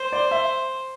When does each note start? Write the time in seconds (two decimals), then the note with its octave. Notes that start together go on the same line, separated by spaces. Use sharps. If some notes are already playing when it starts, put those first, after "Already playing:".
Already playing: C5
0.13 D5
0.31 E5